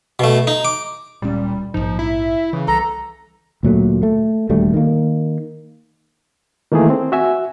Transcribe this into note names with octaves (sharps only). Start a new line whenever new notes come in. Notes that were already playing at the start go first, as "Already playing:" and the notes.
B2 A3
D#4
D6
D1 A#2 G3 G#3 C#4
A#1 G#2 F3 D#4
E4 E5
C#3 E3
C2 A4 A#5
D2 A#2 F#3 A3
A3
D#1 D2 G3 A3
D#3 A#3
D#3 E3 A3 A#3 G#4
C4
F#4 E5 G#5